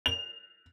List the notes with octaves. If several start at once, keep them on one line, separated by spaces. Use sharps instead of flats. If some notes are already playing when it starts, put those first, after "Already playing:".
F7